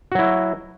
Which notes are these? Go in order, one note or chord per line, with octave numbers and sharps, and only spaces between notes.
F#3 E4 F#4